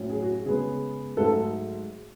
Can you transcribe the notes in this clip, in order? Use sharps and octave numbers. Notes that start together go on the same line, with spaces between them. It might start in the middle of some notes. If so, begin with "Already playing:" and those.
Already playing: A2 F#3 C#4
G#4
F#4
C#3 G#3 B3 G#4
G#2 F#3 A3 A4